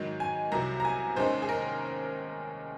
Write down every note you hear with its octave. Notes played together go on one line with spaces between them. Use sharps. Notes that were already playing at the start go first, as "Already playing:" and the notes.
Already playing: G#2 D#3 F#3
G#5
C2 C3 F#3 A#5
A#5
G#5
D#2 D#3 G#3 C#4 C5
G#4
A#4